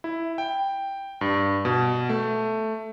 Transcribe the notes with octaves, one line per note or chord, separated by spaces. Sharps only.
E4
G5
G2
B2
A3